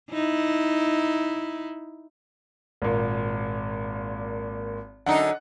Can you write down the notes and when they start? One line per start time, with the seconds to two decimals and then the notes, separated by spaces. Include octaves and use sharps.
0.11 D#4 E4
2.82 G#1 A#2
5.06 F#2 D3 D#4 F#5